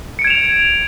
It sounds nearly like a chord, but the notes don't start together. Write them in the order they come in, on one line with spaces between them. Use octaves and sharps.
C#7 D7 G#6 E7 F7